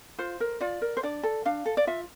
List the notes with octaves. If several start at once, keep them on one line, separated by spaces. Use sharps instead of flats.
F4 C5
A#4
F4 D5
A#4
C5
D4 D5
A4
D4 F5
A4
D5
F4 E5